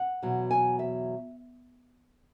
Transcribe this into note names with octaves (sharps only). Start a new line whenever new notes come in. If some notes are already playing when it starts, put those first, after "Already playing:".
Already playing: F#5
E2 B2 F#3
G#5
E5